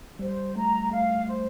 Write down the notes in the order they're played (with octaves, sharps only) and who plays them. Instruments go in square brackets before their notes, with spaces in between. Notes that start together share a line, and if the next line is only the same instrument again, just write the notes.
[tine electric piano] G3 [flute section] C5
[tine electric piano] A3 [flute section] A#5
[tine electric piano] A3 [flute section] F5
[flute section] C5